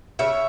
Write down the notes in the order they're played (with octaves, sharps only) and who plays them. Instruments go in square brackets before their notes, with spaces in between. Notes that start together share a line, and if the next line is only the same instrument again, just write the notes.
[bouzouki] C#3 C#5 E5